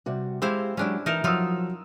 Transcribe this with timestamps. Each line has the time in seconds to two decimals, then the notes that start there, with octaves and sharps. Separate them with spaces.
0.06 C3 G3 F#4
0.42 G#3 C4 E4 G4 C5 F5
0.77 F#3 G#3 C#4 D4 E4 G4
1.06 E3 D#4 A#4 A5
1.24 F3 F#3 D#4 F4 D#6 E6